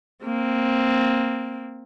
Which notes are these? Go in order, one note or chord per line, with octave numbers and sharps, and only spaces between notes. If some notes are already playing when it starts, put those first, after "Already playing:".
A#3 C4